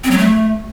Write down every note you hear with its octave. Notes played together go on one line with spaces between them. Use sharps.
C4
F#3
A3